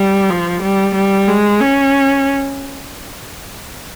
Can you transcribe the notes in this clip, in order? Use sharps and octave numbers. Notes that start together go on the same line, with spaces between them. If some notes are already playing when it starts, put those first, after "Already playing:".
Already playing: G3
F3
G3
G3
G#3
C#4